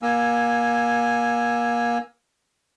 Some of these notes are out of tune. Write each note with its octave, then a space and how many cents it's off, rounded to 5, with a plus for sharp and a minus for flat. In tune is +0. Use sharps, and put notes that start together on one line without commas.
A#3 +25 G#5 +0 E6 +5